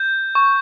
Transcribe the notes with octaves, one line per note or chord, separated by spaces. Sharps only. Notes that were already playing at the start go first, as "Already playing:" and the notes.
Already playing: G6
C#6